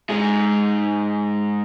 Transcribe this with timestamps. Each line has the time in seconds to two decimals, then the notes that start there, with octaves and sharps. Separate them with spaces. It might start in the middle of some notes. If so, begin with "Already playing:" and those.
0.10 G#2 G#4